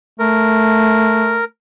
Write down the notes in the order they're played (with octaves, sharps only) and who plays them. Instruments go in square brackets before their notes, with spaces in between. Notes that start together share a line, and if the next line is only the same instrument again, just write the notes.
[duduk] A3 [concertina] A#4